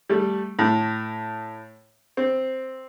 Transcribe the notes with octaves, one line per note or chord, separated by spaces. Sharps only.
G3 A3
A2
C4